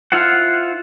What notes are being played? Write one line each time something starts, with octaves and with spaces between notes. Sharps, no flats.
E4 F4 C5 F#5